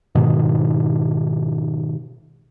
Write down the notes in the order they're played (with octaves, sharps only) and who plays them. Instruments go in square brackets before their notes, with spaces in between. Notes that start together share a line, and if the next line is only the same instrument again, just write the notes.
[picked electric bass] G#2 B2 D#3